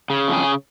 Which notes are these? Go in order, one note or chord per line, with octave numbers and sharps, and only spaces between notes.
C#3
F2
G#4